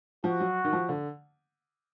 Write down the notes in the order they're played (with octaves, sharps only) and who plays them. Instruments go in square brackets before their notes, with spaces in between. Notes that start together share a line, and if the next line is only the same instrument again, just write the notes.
[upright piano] F3 [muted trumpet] F#4
[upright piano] F#3
D#3
F3
D3